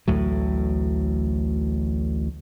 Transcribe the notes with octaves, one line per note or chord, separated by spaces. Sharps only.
A1 D2 A2 F#3